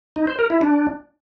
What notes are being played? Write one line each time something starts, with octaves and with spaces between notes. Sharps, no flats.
D#4
C5
A#4
E4
D4